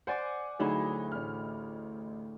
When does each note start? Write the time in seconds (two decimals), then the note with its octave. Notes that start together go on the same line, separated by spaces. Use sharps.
0.07 C5 D5 F#5 G#5 D6
0.59 D2 F#3 D#4 E4 G#4
1.12 A1 F6